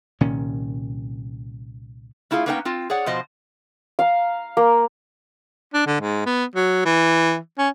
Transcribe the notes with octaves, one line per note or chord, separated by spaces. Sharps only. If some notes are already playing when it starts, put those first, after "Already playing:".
C2 A#2 D#3 C#4
A3 E4 F4 G#4 F5
A#3 B3 C#4 D#4 D5 G5
C4 F4
G#4 C#5 D5 F#5
B2 F3 C5 D#5
F5 A#5
A#3
D4
D3
G#2
B3
F#3
E3
C#4